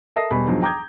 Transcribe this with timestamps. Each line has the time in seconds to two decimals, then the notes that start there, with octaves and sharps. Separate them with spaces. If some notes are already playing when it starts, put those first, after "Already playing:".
0.16 A4 A#4 E5 D#6 A#6 C7
0.31 E1 B2 G3 G#5 B5
0.46 E2 G2 D#3 F3 F#3
0.62 G5 A#5 D6 D#6 G6 G#6